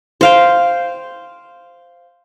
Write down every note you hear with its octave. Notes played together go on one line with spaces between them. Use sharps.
C5 F5 G5